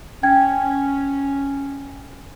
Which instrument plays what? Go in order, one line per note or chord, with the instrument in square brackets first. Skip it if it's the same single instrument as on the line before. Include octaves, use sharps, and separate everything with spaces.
[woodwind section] C#4 [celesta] G5 G#6